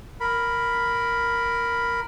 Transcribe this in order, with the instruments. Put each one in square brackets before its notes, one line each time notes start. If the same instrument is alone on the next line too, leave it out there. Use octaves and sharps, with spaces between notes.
[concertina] A#4 B5